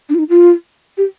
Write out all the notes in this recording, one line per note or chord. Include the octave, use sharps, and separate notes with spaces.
D4
F4
D#4
F4
G4